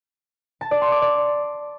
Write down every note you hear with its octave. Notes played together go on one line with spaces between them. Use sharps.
A5
D5
C6
D6
D5